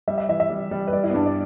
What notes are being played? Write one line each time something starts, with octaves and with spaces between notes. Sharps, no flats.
G3 E5
E5
E3 E5
E5
G3
G3
B4
G3 D5
E4
B3
G2 D4
D5